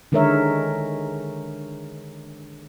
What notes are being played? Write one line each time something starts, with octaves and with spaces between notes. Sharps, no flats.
D3 D#3 G#3 A#4 C#5 E5